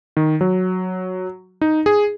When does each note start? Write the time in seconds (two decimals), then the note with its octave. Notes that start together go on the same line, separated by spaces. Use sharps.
0.17 D#3
0.41 F#3
1.61 D#4
1.86 G#4